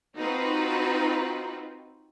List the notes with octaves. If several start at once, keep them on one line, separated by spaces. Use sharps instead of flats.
C4 D#4 F4 F#4 B4